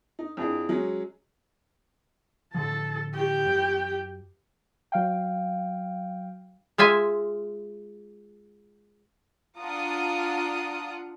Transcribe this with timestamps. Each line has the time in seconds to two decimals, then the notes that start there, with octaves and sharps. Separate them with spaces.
0.19 D#4
0.37 F2 D4 E4 G#4
0.69 F#3 G#3 C#4
2.54 A2 D3 F3 A4 A5
3.14 G4 G5
3.46 F#2
4.92 F#3 F5 G5
6.78 G#3 F4 E5 G#5
9.58 D4 F4 F#5 A#5 D#6